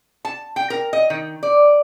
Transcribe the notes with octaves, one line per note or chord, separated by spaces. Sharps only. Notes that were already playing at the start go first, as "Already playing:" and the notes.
A5
G5
A#4
D#5
D#3
D5